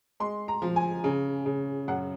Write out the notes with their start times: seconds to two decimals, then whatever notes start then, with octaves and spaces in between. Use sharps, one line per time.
0.20 G#3 C6
0.48 A#5
0.62 F3
0.76 G#5
1.04 C#3
1.46 C#3
1.88 F#2 F#5